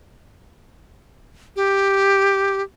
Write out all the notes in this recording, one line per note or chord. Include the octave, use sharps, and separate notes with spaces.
G4